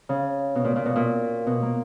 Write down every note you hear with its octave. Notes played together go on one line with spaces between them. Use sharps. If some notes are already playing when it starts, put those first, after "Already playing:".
C#3
B2
A#2
A#2
B2
A#2
B2
A#3